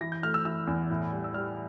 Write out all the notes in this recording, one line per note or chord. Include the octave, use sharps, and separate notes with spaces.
E3 A#6
G6
A3 F6
E6
E3 E6
E2
A2
G3
E6
G3 F6